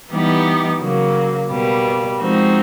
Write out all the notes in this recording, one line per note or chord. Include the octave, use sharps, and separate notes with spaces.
E3 G3 B3 D#4 G4
C#3 F#3 A#3
B2 G3 A#3
F3 G#3 C4 D#4 F#4